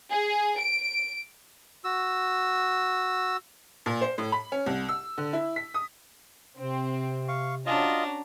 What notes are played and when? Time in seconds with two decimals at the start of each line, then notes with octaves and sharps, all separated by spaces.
0.10 G#4
0.60 D7
1.84 F#4 E6
3.86 A#2
4.01 C5
4.18 A2
4.32 B5
4.52 C#4
4.66 C2
4.89 E6
5.18 D3
5.33 E4
5.56 B6
5.74 D#6
6.57 C3 C4
7.28 F5 C#6
7.66 C#4 D4 F4 F#4 D#5 A#5